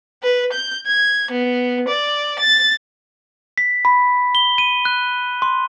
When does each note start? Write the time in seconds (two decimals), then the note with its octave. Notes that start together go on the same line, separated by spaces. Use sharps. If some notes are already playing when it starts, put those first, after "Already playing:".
0.23 B4
0.53 G6
0.87 G#6
1.31 B3
1.88 D5
2.40 A6
3.58 B6
3.85 B5
4.35 G7
4.58 D#7
4.85 F#6
5.42 C6